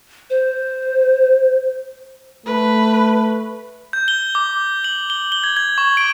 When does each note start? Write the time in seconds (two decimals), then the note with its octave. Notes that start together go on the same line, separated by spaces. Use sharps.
0.30 C5
2.46 A3 B4
3.93 G6
4.08 G7
4.35 D6
4.84 F#7
5.10 G7
5.32 G7
5.44 G#6
5.57 G#6
5.78 C#6
5.97 D7